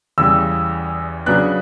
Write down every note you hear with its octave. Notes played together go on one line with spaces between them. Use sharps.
E2 C#3 G3 E6
C#3 F#3 B3 D4 F#6